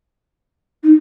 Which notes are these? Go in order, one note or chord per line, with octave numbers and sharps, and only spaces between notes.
D#4